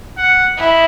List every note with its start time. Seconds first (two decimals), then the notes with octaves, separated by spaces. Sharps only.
0.18 F#5
0.57 E4 D#5